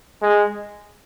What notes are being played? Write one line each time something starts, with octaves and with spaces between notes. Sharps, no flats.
G#3